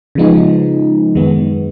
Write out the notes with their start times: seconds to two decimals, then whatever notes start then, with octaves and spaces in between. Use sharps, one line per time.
0.15 C#3 F3 G#3 B3 D#4
1.15 F#2 D#3 G#3 B3